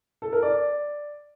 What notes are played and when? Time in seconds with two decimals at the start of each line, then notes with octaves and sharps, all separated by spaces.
0.22 A4
0.33 A#4
0.42 D5